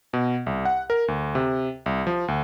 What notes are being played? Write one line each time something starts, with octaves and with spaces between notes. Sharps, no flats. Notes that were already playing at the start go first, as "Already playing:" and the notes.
B2
C2
F#5
A#4
D2
C3
C2
F3
D2